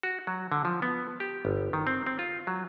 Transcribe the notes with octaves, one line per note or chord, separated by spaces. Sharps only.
F#4
F#3
D3
F3
B3
G4
G1
D#3
C4
C4
F4
F#3